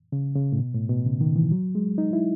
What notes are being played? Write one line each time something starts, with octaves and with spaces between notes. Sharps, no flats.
C#3
C#3
A2
B2
A2
B2
C#3
D#3
E3
F#3
G#3
D#4
E4